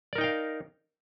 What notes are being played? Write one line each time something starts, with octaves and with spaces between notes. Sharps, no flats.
D#4 A#4 D5 F5 G5